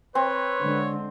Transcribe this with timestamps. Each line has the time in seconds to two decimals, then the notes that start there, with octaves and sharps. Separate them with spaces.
0.15 C4 B4 C#5
0.60 D3 G#3